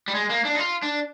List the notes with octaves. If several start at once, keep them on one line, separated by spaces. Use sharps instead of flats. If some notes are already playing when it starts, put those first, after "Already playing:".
G3
G#3
A#3
D4
D#4
F4
D4